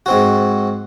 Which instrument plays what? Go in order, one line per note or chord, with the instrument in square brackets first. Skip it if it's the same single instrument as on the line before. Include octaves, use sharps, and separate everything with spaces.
[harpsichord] G#2 C4 F#4